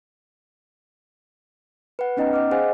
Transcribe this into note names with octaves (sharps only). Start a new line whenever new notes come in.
B4 F#5
B3 C#4 D#4 D#5 G5 A#5
D#5 F#5 D6 F6
G#4 C5 D#5 F5 F#5 G#5